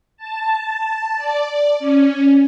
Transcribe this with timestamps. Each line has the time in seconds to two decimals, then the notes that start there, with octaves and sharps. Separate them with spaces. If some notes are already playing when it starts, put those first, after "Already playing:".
0.17 A5
1.17 D5
1.79 C#4